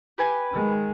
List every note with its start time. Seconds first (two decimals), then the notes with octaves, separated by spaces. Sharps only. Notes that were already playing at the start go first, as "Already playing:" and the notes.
0.18 G4 B4 G#5
0.52 D#3 G#3